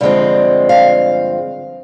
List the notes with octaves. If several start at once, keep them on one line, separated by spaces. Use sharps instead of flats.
G2 D3 F3 G#3 C4
F5